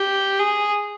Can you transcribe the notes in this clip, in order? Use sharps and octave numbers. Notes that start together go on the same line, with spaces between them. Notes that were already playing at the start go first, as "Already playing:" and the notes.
Already playing: G4
G#4